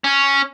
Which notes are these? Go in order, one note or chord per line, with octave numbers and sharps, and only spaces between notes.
C#4